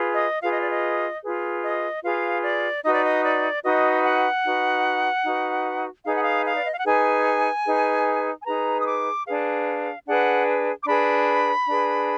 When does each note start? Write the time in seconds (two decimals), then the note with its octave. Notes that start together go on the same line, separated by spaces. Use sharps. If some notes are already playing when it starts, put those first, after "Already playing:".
Already playing: F4 G#4 B4
0.15 D#5
0.42 F4 G#4 B4 F5
0.51 D#5
0.61 D5
0.70 D#5
1.23 F4 G#4 B4
1.63 D#5
2.03 F4 G#4 B4 F5
2.43 D5
2.83 D#4 F#4 B4 D#5
2.94 D5
3.04 D#5
3.23 D5
3.63 D#4 F#4 B4 D#5
4.04 F#5
4.44 D#4 F#4 B4
5.24 D#4 F#4 B4
6.04 D#4 G#4 B4 F5
6.14 F#5
6.24 F5
6.45 F5
6.56 D5
6.64 D#5
6.71 F5
6.78 F#5
6.85 D#4 G#4 B4 G#5
7.66 D#4 G#4 B4
8.42 G#5
8.45 D#4 G#4 B4 A#5
8.80 D#6
8.86 D6
9.26 D4 G#4 B4 F5
10.07 D4 G#4 B4 F#5
10.83 D6
10.87 D4 G#4 B4 B5
11.67 D4 G#4 B4